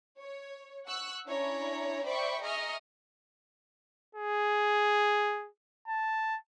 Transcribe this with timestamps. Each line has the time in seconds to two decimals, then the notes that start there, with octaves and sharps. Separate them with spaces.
0.18 C#5
0.86 F#5 C#6 E6 F#6
1.27 C#4 D4 E4 C#5 A#5
2.05 C5 D5 E5 G5 B5 C#6
2.42 G#4 D#5 E5 A#5 C#6 F6
4.15 G#4
5.88 A5